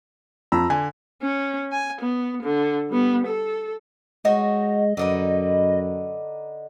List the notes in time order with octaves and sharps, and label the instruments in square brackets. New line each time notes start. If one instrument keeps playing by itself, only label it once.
[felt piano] F2 [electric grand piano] A#5 B5 E6
[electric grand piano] D3 [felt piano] G#5
[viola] C#4
G#5
B3
D3
G3 B3
A4
[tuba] G#3 [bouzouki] D#4 F#4 C#5 [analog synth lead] D#5
[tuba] F#2 [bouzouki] D3 D#4 B4